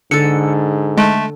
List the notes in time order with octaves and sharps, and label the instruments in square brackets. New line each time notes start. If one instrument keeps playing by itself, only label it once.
[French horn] G#2 [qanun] D3 A4 [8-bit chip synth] C#7
[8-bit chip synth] G#3 [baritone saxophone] A3